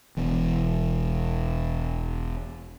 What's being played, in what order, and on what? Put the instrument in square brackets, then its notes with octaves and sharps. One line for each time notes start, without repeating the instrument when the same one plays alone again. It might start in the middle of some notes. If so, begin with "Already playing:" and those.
[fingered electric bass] E1 E2